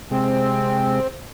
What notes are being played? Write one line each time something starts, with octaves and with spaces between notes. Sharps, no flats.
C3 G#3 C4